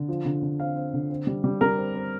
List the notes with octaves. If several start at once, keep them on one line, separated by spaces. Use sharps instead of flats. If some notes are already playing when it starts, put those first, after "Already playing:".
Already playing: D3
F3
D3
D3
C4 F5
C4
D3
C4
G3
G3
G3 A#4
C4
C4